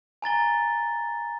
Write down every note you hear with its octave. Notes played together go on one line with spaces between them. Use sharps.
G#5 A#5 A6 G7